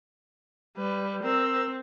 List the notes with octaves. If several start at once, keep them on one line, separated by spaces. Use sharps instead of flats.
G3 B4
C4 A#4 E6